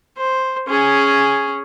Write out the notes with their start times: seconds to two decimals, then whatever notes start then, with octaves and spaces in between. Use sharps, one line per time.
0.18 C5
0.68 C#4 G#4